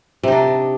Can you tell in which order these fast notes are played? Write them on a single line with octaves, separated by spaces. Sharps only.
C3 D#4 D4